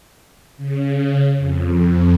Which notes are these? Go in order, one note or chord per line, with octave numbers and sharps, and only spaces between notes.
C#3
F2